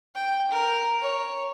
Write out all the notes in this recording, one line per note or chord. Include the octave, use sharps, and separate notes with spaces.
G5
A#4
C#5